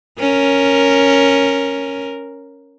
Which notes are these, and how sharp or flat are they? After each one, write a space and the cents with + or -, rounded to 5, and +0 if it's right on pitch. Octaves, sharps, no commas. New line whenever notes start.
C#4 +0 A#4 +0